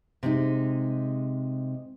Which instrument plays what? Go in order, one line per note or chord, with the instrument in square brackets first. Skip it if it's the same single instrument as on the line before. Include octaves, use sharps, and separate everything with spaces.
[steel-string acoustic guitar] C3 G#3 D#4